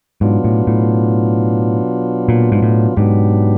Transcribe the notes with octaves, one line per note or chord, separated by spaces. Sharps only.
G#2 B2 F#3 B3 D4 F4
A2
A2
A#2
G#2
A2
G#2 B2 F#3 B3 D4 G4